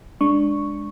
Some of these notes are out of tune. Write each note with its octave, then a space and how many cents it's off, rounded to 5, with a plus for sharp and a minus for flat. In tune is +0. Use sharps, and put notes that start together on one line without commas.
G#3 +0 D4 +0 C#6 +0